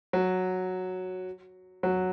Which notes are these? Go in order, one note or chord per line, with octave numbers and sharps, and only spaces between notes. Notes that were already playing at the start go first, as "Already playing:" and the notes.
F#3
F#3